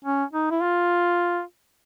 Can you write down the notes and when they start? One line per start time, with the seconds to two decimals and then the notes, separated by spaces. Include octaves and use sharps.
0.05 C#4
0.33 D#4
0.51 E4
0.62 F4